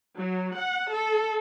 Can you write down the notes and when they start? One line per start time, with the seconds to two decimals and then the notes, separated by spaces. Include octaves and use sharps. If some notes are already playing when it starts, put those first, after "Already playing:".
0.16 F#3
0.57 F#5
0.91 A4